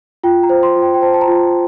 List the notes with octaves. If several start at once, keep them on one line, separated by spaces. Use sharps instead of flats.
F4 G5
A#5
C5
C6
F4
G5
G5
C5 A5
A5
A#5
F4